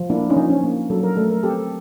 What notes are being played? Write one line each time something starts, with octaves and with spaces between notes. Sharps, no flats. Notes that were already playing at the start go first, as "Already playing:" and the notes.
Already playing: F3
A#3 D4 E4
C#4 D#4
F3
C#4
A#3
F#3 A4
A#4
A3 A4
A#4
C4 G4 A4